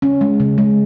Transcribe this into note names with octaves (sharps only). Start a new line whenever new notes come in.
C#3 C#4
G#3
C#3
G#3